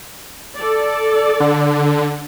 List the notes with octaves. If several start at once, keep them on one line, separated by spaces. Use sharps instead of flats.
A4 D5
D3